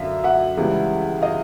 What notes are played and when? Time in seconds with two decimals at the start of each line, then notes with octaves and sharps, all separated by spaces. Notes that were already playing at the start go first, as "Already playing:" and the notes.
Already playing: F#2 D3 E5 F5
0.24 E5 F#5
0.57 C#2 C#3 E3 G3
1.21 D#5 F5